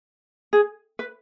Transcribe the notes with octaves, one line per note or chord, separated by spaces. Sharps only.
G#4
B4